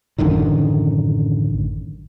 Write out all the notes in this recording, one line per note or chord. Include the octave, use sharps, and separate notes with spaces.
A1 F#2 D3 D#3